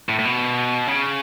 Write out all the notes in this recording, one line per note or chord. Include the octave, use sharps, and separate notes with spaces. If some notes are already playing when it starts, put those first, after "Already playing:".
A2
A2
B2
C#3